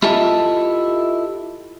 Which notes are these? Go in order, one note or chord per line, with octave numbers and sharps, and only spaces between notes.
E4 F4 G4 A4 D#5 E5